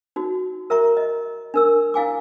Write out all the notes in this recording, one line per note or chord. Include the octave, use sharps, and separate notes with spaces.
D#4 F#4
A#4 E5 A#5 C#6
D#5
D4 A#4 E6
E4 F5 G#5 D6